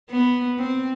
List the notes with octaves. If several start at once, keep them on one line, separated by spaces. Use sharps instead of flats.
B3
C4